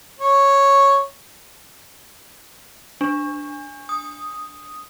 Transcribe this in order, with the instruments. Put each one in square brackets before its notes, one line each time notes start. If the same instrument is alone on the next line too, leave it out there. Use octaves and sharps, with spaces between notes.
[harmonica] C#5
[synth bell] D4
D#6